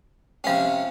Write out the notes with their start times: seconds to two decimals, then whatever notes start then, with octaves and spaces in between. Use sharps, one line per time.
0.44 C3 F3 C#4 F5 G5